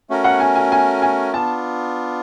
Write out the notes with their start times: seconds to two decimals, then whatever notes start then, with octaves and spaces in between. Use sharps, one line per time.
0.10 A3 C#4 F#4 A#4
0.24 F#5
0.40 G#5
0.56 G#5
0.72 G#5
1.02 G#5
1.33 B3 D4 F4 A5